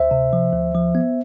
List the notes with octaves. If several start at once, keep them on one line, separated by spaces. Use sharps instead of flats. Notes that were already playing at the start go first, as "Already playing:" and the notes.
Already playing: D2 C5 E5
C3
F3
D2
F3
B3